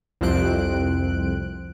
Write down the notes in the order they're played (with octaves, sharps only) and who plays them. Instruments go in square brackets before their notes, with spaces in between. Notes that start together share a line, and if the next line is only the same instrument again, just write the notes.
[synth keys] C2 F2 C4 F#6 D7